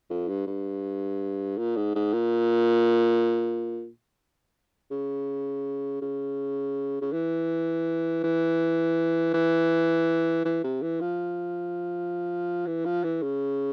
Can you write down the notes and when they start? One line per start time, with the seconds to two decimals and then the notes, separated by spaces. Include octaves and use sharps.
0.10 F2
0.28 G2
0.47 G2
1.58 A#2
1.76 G#2
1.95 G#2
2.13 A#2
4.91 C#3
6.02 C#3
7.01 C#3
7.12 E3
8.24 E3
9.34 E3
10.45 E3
10.64 C3
10.82 E3
11.01 F3
12.67 E3
12.85 F3
13.04 E3
13.23 C#3